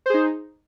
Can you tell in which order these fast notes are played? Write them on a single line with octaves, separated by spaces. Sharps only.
C5 G#4 D#4